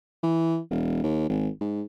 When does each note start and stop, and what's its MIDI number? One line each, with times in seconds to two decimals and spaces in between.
0.23 0.59 52
0.71 1.01 28
1.04 1.25 39
1.29 1.49 32
1.61 1.83 44